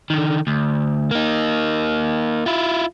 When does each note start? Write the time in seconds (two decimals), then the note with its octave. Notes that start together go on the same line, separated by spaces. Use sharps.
0.10 D3 D#3
0.47 D2
1.11 A#3 D#4
2.46 E4 F4